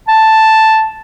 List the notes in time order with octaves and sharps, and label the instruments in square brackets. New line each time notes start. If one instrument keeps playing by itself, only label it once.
[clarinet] A5